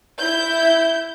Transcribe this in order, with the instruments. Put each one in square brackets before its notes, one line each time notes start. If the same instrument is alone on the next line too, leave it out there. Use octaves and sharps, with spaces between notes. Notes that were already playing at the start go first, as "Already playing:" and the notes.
[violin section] E4 G6